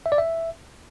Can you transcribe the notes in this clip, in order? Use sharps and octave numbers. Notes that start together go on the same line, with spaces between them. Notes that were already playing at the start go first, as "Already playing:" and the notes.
E5
D5
E5